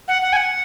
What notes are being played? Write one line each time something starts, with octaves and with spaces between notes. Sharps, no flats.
F#5
F#5
G#5
F#5